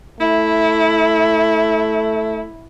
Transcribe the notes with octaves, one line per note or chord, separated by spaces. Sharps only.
A3 E4